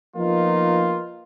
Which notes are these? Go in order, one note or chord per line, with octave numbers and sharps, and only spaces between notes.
F3 A#3 B3 D#4 F4